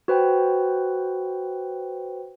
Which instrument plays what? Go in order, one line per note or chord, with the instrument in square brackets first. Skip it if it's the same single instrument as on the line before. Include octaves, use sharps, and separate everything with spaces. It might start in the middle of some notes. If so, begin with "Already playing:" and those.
[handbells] F#4 B4 C5 G5